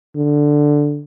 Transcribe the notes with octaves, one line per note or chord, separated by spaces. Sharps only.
D3